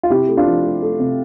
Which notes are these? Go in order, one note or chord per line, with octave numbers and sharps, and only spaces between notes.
F4
C3 E4 G4
A3
D4 F4
F3
A3
A3
C3